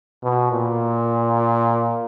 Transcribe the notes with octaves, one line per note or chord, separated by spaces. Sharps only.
B2
A#2